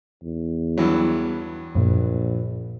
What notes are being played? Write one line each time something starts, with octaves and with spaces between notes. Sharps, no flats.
E2
G2 E3 F#3
A#1 F#2 A#2